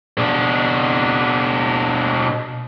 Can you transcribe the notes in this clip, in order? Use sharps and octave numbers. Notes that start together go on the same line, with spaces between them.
B2 D4